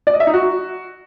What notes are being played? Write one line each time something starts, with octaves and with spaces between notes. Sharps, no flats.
D5
D#5
E5
D#4
F#4